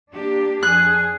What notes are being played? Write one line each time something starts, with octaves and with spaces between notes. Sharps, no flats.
A#3 D4 G4
F2 D4 G#4 F#6